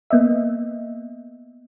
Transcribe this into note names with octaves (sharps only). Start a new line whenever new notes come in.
A#3 B3 D#5 E5